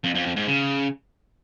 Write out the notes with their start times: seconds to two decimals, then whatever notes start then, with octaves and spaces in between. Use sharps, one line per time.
0.04 F2
0.15 F2
0.26 F2
0.36 G#2
0.47 C#3